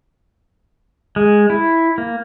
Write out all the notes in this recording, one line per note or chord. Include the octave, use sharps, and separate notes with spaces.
G#3
E4
A#3